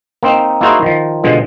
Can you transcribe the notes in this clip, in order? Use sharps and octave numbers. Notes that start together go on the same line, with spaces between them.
A#3 C4 D#4
A#3 D#4 E4 F#4 G#4 C5
D#3 F3
B2 D3 F3 G#3